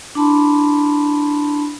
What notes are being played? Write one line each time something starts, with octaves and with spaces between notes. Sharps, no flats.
D4 E4 A5 B5 C6